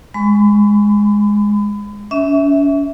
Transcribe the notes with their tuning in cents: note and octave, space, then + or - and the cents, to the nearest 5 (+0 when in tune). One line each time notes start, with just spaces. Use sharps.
G#3 -5 B5 +30
C#4 +40 E5 -25